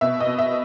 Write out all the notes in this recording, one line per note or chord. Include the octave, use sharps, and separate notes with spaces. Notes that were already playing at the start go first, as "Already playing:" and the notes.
B2 E5
D#5
B2
E5